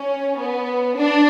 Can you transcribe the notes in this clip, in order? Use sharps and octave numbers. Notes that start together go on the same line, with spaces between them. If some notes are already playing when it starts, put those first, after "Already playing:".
Already playing: C#4
B3
D4